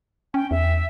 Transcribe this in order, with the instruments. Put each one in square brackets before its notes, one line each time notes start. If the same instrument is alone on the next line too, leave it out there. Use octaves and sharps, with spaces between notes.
[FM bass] C#4 [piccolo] G5
[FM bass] E2 [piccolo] E5